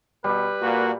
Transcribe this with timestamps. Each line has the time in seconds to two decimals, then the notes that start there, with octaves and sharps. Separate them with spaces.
0.24 B2 G3 B4
0.62 A#2 A#3 F#4